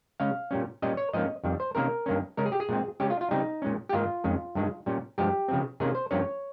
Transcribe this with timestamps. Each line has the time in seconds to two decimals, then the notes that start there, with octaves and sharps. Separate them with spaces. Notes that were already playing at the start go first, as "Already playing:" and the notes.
0.20 C#3 G#3 C#4 F5
0.51 A#2 G3 C#4
0.82 A#2 G3 C#4 D#5
0.97 C#5
1.13 G#2 F3 A#3 C#4 D#5
1.44 F2 D#3 G3
1.60 C5
1.75 C3 D#3 A#3 C#4 A#4
2.06 G2 D#3 A#3 C#4
2.37 C#3 G#3 C#4 A#4
2.46 G#4
2.52 G4
2.60 G#4
2.69 A#2 G#3 C4
3.00 C#3 G#3 C#4 G4
3.10 F4
3.21 F4
3.31 C#3 G3 C4 D#4
3.62 A#2 G#3 C#4
3.89 G4
3.93 G#2 D#3 A#3 F4
4.24 F2 D#3 G#3 C#4
4.55 G2 D#3 G#3
4.86 A#2 G3 C#4
5.18 G2 F3 G#3 G4
5.48 C#3 F3 C4
5.80 C3 D#3 A#3 C#4 G#4
5.95 C5
6.11 G2 F3 A#3 C#4 C#5